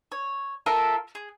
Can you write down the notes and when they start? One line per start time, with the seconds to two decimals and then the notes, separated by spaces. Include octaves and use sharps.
0.12 C#5
0.66 F4 A4 A#4 E5
1.15 G#4